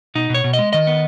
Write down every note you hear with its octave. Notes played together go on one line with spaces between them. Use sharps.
B2 D#4
B2 C#5
B2
D#5
G#3
D#3 D#5
B3